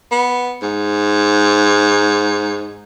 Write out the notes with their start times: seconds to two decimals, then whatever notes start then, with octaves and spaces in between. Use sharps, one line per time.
0.12 B3
0.62 G#2